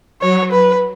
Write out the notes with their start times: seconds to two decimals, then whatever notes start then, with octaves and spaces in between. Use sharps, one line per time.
0.21 F#3 C#5
0.52 B4